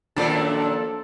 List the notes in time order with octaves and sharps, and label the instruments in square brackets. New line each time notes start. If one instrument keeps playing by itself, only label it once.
[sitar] F#2 A#2 D#3 [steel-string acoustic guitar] F3 A#3 [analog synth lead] D4 [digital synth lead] A4